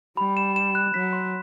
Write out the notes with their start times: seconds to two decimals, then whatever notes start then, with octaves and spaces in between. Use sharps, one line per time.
0.17 G3 B5
0.37 E7
0.56 E7
0.75 F#6
0.94 F#3 B6
1.13 C6